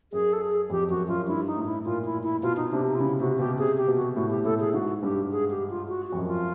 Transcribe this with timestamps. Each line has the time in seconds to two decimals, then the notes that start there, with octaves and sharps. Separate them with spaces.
0.13 F#2 G#4
0.33 A4
0.41 G#4
0.70 F2 G4
0.89 F#2 F#4
1.08 F#2 F4
1.28 G2 E4
1.47 D#4
1.56 A2
1.65 E4
1.85 A#2 F4
2.05 E4
2.23 E4
2.43 B2 F4
2.57 D#4
2.72 C3 D4
2.87 D#4
2.95 F4
3.00 C#3 E4
3.20 C3 F#4
3.39 B2 G4
3.58 C3 G#4
3.77 G4
3.87 B2
3.96 F#4
4.16 A2 F#4
4.30 G4
4.44 A2 A4
4.60 G#4
4.73 G#2 F#4
5.02 G2 G4
5.31 G#4
5.50 G4
5.70 F4
5.89 F#4
6.07 F2 F#4
6.17 F#2
6.26 F4